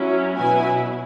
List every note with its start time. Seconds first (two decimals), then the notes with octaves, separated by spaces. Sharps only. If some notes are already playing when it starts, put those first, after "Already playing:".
Already playing: F#3 C#4 E4
0.36 B2 F#3 B3 E4 G#5